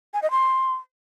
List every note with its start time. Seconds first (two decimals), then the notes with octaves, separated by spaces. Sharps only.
0.14 G#5
0.22 D#5
0.31 C6